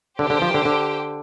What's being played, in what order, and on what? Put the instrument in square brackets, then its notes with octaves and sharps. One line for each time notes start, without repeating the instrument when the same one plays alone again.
[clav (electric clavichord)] D3 [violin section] G4 C5 G5
[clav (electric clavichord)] D3
F3
D3
D3